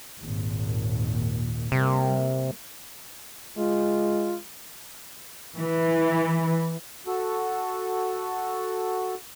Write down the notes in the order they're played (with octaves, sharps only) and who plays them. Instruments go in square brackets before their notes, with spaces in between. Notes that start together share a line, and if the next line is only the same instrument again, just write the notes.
[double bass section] G#1 D#2 A#2
[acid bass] C3 [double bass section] G3 A#3
[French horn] G#3 [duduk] F4
[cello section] E3
[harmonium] F#4 A4